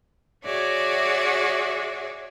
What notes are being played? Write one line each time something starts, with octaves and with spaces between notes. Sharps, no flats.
F#4 G#4 C#5 D5 E5